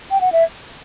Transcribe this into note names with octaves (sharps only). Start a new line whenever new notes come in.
G5
F#5
E5